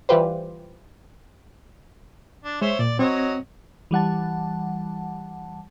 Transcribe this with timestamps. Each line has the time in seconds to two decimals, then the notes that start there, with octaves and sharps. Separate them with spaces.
0.09 E3 G3 F4 G4 B4 C5
2.44 D4
2.62 G#3 C5 C#5 E5
2.79 A#2 D5
2.99 F#3 C4 C#5 D#5
3.91 E3 G3 F#5 A5